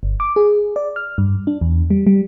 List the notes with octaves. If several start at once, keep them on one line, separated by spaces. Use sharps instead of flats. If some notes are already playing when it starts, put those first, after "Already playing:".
G1
D6
G#4
D5
F6
G2
D4
E2
G3
G3